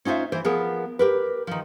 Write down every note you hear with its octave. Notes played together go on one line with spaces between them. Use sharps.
C#4 D#4 F4 C5 E5
E3 C5
F3 B3 G#4 A#4
G4 A#4 B4
D#3 F3